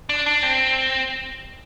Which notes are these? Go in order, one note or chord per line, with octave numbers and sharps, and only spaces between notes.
D4
D4
C4